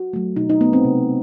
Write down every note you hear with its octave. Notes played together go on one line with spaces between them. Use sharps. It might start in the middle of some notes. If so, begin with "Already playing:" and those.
Already playing: F#4
F#3 A3
B2 D#4
D#4
A3 B3
C4
C3